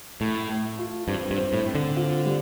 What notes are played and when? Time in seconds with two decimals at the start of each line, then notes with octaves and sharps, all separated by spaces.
0.21 A2 A3
0.50 A3
0.79 F4
1.08 G2 C4
1.31 G2
1.38 C5
1.53 A2
1.67 C4
1.75 D3
1.97 F4
2.26 G3